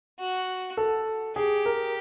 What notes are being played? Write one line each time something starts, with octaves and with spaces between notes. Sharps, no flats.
F#4
A4
G4 G#4
A#4